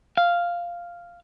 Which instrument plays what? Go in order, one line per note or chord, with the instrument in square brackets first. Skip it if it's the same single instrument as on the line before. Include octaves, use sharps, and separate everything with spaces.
[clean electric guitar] F5